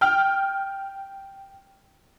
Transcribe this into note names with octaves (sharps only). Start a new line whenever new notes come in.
G5 F6